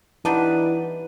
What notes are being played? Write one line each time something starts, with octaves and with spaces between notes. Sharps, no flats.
E3 G3 D4 D#4 B4 F#5 D#7